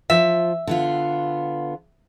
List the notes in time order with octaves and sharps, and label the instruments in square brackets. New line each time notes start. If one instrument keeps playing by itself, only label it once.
[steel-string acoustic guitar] F3 [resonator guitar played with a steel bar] E5
[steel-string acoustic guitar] D3 B3 F4